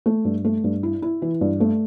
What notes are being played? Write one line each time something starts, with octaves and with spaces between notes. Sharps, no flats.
A3
G2
A3
G2
E4
E4
E3
G2
A3